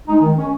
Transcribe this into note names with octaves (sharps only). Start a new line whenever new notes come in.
G#3 D#4
D#3
G#3 C#4